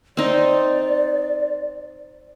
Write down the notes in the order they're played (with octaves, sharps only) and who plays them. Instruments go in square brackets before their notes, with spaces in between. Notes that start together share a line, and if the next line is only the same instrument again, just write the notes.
[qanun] C4 D#4 [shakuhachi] D5